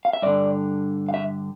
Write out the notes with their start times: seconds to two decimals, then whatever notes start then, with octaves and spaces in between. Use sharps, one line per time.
0.05 F5
0.13 E5
0.22 G2 D3 D5
1.09 F5
1.14 E5